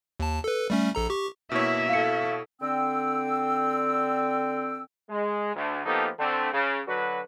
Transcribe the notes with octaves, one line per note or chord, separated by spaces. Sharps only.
D#2 A5
A4 B4
G3 A3 C#4
A#1 A4 A#5
G4 C#6
B2 A#3 E4 C#5 E5
E4 A4 F5 C#7
D3 C4 G5 E6
G#3
D2
F3 A#3 B3 D#4 G4 A4
D3 A3 C4
C#3
D3 F#3 F#4 B4